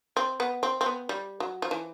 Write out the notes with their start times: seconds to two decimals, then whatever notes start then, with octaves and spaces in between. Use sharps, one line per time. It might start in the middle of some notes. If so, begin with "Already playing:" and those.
0.17 C4
0.40 B3
0.63 C4
0.81 C4
0.86 B3
1.09 G3
1.40 F#3
1.62 F3
1.71 E3